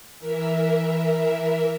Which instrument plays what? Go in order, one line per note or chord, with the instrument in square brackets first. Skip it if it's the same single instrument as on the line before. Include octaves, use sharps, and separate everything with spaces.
[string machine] E3 A#4 E5